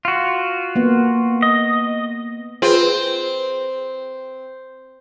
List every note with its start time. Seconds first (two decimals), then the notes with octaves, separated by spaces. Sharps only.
0.05 F4 F#4
0.76 A#3 B3
1.42 D#5
2.62 C4 F4 G#4 B4